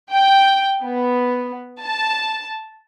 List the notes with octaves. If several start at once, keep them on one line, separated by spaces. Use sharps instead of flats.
G5
B3
A5